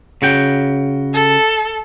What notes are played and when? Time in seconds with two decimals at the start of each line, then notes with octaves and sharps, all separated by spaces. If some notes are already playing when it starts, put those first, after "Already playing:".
0.22 C#3 F#4 G5
1.14 A4